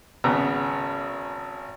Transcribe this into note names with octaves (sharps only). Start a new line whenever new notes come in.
G#1 C#3 B3 A#5